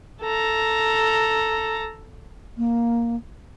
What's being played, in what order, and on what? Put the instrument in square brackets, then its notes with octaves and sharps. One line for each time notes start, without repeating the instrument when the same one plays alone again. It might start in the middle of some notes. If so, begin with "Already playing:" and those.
[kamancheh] A4 A#5
[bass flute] A#3